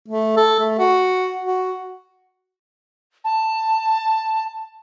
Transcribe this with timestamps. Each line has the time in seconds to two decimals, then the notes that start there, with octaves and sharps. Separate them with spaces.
0.08 A3
0.37 A4
0.60 A3
0.79 F#4
1.44 F#4
3.24 A5